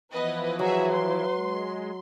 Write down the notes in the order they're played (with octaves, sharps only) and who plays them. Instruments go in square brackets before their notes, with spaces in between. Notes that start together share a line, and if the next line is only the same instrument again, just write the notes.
[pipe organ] E3 F3 E4 [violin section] B3 B4 D#5
[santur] F#3 [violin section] F#4 G#4 E5 [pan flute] B4
[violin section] C6
[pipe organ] G#3